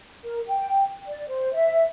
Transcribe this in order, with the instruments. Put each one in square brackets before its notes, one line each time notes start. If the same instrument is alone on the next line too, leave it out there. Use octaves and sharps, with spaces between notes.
[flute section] A#4
G5
D5
C5
E5